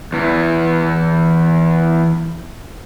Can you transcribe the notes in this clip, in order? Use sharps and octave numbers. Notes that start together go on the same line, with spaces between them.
E2 E3